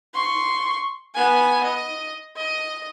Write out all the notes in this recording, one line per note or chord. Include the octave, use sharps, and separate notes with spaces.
C6 C#6
B3 G#5
D#5
D#5